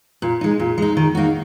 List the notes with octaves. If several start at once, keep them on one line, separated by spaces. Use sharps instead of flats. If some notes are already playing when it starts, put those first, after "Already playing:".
A#2
G#3 D#4
A#2
G#3 D#4
D#3
A#3 D#4 F#4